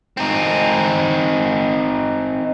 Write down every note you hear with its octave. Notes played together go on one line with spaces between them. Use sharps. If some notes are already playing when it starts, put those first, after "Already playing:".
C4 D#4